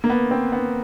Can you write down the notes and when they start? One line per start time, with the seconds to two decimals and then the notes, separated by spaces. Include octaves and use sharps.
0.04 A#3
0.10 B3
0.31 C4
0.52 B3